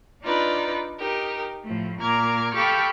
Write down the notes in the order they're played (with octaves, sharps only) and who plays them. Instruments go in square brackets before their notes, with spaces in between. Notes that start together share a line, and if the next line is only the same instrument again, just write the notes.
[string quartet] D4 D#4 F4 B4 D5
D#4 G4 A#4
A2 F3 A3
A#2 A#4 A#5 D6 F6 G#6
G4 A4 F5 G5 B5 C#6